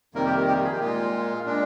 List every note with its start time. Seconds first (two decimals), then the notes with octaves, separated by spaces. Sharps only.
0.14 F2 C3 D#3 G3 A#3 A#4
0.26 G4
0.37 A#4
0.47 G4
0.56 F4
0.64 G#4
0.72 G4
0.80 A#2 G#3 F4
1.46 A#2 G#3 D4